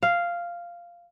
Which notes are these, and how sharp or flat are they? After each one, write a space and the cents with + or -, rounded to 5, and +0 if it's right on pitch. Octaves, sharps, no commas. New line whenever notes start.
F5 -5